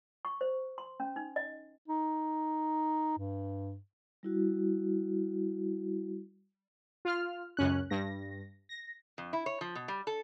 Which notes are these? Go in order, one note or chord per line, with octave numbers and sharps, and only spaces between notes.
C#6
C5
C6
C#4
D#4
D#5
D#4
G2
G3 E4 F#4
F4 F6
C#2 F#2 C#4 F#6
G2 A#6
A#6
F2
E4
C#5
F3
B2
G3
A4